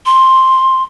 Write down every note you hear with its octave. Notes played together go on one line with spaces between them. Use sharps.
C6